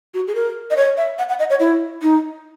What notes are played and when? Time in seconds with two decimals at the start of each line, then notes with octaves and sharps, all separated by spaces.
0.14 F#4
0.28 G#4
0.35 A#4
0.71 D#5
0.77 C#5
0.97 E5
1.19 F#5
1.29 F#5
1.39 D#5
1.50 C#5
1.60 E4
2.02 D#4